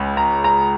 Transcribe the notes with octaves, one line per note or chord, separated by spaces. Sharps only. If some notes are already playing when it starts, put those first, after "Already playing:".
Already playing: C#2 C#3
A#5
A#5